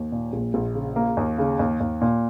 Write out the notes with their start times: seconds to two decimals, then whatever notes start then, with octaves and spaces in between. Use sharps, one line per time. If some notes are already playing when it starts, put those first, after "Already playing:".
Already playing: D#2
0.12 A#2
0.33 A#1
0.54 A#1
0.75 C#3
0.96 A#3
1.17 D#2
1.38 C#3
1.59 D#2
1.80 D#2
2.01 A#2